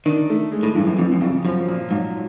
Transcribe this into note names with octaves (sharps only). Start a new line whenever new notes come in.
D#3 D4
A3
G#3
A2
G2 E3
F#2
F2 E3
F#2
F2 C#3
F#2 F3
A#2
G#2 F#3